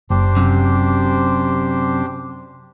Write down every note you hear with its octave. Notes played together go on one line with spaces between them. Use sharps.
F#1 D4 G4 C5
F#2 C3